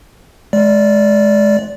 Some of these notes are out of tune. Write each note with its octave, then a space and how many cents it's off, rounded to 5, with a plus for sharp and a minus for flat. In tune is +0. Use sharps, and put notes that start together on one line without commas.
G#3 +25 D5 -15